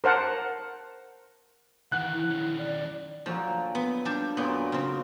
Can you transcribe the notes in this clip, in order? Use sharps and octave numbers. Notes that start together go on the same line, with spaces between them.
A#4 C5 F#5 A5
D#3 E3 F#5 F#6
E4
D#3 C#4
D5
A#2 D3 F3 F#3
B3
G3 D4 G4
F#2 A#2 D3 B3 C6
C#3 C4